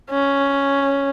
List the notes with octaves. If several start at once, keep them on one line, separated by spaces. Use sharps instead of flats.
C#4